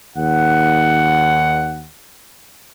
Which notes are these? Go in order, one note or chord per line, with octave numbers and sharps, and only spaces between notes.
D#2 F#5